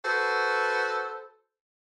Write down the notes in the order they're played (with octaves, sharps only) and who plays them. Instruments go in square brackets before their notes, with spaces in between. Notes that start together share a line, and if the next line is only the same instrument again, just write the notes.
[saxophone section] F#4 A4 B4 C5